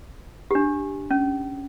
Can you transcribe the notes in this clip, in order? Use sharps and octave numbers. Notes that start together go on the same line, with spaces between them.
D4 G4
C#4